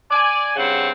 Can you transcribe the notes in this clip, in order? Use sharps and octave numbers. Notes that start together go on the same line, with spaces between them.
D5 G#5
G2 C#3 C4 F#5